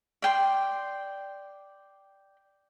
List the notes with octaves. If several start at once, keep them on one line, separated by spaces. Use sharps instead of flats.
D5 G5 C6